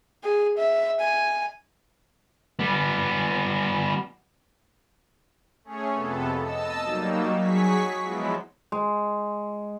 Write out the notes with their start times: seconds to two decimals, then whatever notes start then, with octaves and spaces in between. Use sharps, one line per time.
0.24 G#4
0.58 E5
1.01 G#5
2.59 G3 B3
5.64 A3 C#4 G#4 C#5
5.93 F2 C3 B3 A4
6.41 D#5 A5 E6
6.83 F#3 G3 A#3 D#4
7.37 F#3 G#4 C#6 B6
8.04 F3 F#3 G#3 B3 E4
8.72 G#3